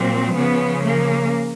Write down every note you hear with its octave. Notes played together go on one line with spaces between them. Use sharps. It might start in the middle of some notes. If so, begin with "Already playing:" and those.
Already playing: A#2 F#3 C4
C#3 F3 B3
A#3